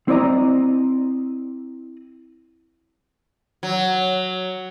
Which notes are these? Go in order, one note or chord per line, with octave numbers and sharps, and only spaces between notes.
C4 E4 D5 D#5 A#5
F#3